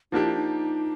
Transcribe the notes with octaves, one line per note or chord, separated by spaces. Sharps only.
F3 A#3 D4 D#4 G4
E4
D#4